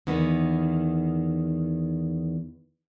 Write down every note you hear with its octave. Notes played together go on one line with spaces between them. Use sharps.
E2 D#3 B3